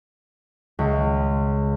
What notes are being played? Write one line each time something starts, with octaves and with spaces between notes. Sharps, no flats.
C#2